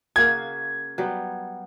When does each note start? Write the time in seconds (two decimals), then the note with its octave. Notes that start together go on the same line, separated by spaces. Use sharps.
0.16 C#3 A#3 F#4 G#6
0.98 F#3 G3 B3